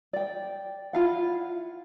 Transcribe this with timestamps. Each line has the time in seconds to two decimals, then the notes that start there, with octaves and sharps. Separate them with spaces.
0.13 D5 G5
0.93 E4 F4 F5 F#5